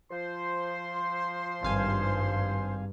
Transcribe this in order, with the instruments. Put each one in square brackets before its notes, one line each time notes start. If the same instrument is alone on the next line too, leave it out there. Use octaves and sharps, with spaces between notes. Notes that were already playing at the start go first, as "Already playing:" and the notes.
[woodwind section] F3 C5 [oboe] C6
[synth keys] G#1 F5 G#5 [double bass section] G2